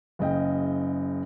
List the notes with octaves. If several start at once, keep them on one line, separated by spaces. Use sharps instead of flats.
F#1 C#3 D#5 G5